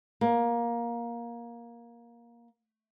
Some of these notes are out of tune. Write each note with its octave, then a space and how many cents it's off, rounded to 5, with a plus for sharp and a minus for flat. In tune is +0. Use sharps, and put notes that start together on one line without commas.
A#3 +15